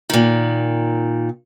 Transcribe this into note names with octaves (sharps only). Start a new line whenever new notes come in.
A#2 D#3